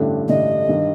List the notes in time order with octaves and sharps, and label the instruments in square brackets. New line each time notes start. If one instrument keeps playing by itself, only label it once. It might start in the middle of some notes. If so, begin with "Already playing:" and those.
Already playing: [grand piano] A1 G2 D3 A3 D4
[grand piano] A1 G2 D3 A3 D4 [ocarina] D#5
[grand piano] G2 D#3